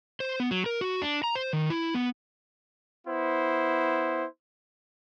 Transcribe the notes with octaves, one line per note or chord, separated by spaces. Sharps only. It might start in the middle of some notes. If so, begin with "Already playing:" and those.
C5
B3
F#3
A#4
F#4
D4
A#5
C5
D#3
E4
B3
B3 E4 C5